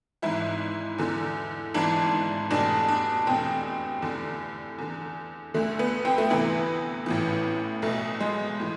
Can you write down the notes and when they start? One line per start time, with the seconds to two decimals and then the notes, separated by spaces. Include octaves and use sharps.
0.22 G#1 G#2 E3 E4
0.98 E2 D3
1.74 G#1 G#2 E3 D4
2.51 F1 E2 B2 D4
2.88 D4
3.27 F1 E2 B2 C4
4.02 F1 E2 D3
4.78 E2 D3
5.54 D2 D3 A3
5.79 B3
6.05 C4
6.18 A3
6.30 D2 C3 E3 B3
7.06 A1 A2 E3
7.82 B1 B2 A3
8.21 G#3
8.60 A2 E3